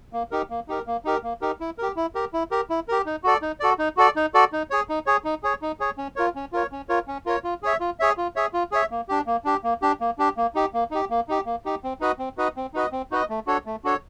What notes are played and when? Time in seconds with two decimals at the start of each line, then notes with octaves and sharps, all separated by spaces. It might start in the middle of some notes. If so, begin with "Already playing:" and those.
0.13 A#3
0.31 D#4 G4 A#4
0.50 A#3
0.68 D#4 G4 A#4
0.87 A#3
1.05 D#4 G4 A#4
1.23 A#3
1.41 D#4 G4 A#4
1.60 E4
1.78 G4 A#4
1.96 E4
2.15 G4 A#4
2.33 E4
2.51 G4 A#4
2.70 E4
2.88 G4 A#4
3.06 D#4
3.24 F#4 A4 D5
3.42 D#4
3.60 F#4 A4 D5
3.79 D#4
3.97 F#4 A4 D5
4.16 D#4
4.34 F#4 A4 D5
4.53 D#4
4.70 G#4 C#5
4.89 D#4
5.06 G#4 C#5
5.24 D#4
5.43 G#4 C#5
5.62 D#4
5.80 G#4 C#5
5.98 C#4
6.16 F4 A#4 C#5
6.35 C#4
6.52 F4 A#4 C#5
6.72 C#4
6.89 F4 A#4 C#5
7.08 C#4
7.26 F4 A#4 C#5
7.44 F4
7.63 G#4 C#5 E5
7.80 F4
8.00 G#4 C#5 E5
8.17 F4
8.36 G#4 C#5 E5
8.53 F4
8.72 G#4 C#5 E5
8.91 A#3
9.09 D4 G4
9.27 A#3
9.45 D4 G4
9.64 A#3
9.82 D4 G4
10.01 A#3
10.19 D4 G4
10.37 A#3
10.55 D#4 G4
10.74 A#3
10.91 D#4 G4
11.10 A#3
11.28 D#4 G4
11.46 A#3
11.65 D#4 G4
11.83 C4
12.00 D#4 F#4 B4 D#5
12.19 C4
12.37 D#4 F#4 B4 D#5
12.57 C4
12.74 D#4 F#4 B4 D#5
12.92 C4
13.11 D#4 F#4 B4 D#5
13.30 A3
13.47 D4 F#4 A4 C#5
13.66 A3
13.84 D4 F#4 A4 C#5